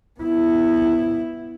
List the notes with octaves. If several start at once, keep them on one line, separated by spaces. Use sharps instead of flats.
B3 E4